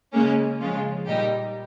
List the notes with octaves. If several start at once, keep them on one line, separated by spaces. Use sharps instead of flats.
C#3 G#3 A#3 C#4
C#3 F3 G#3 C#4 F4
A#2 G3 D#4 G4